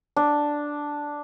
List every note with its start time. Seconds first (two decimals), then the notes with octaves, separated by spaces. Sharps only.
0.17 D4